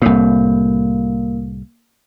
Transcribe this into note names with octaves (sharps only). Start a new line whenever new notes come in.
C2 A2 A#3